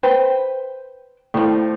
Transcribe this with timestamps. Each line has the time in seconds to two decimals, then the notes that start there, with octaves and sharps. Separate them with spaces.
0.03 B4 C5 G5
1.34 A2 F3 G3